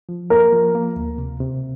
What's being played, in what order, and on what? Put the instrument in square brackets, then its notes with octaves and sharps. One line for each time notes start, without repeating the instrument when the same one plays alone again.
[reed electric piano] F3
[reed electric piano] A#3 [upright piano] A#4
[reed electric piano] F3
A#3
D2
C3
C3